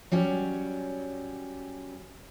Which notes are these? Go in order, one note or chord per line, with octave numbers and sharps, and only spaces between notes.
F#3 G3 C#4